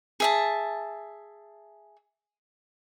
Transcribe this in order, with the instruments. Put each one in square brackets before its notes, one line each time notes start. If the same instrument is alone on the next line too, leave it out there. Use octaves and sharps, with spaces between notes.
[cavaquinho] G#4 E5 A5